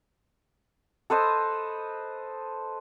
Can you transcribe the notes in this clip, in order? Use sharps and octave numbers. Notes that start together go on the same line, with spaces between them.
A4 B4 C5 D#5